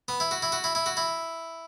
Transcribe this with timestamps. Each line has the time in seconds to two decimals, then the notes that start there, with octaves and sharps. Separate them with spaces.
0.08 B3
0.20 E4
0.31 F#4
0.42 E4
0.52 F#4
0.64 E4
0.75 E4
0.86 F#4
0.97 E4